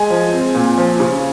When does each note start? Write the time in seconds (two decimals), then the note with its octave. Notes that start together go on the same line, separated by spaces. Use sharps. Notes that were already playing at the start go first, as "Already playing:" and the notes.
Already playing: G#3 G#5
0.10 F3
0.32 C4
0.55 A#2
0.78 F3
1.00 C#3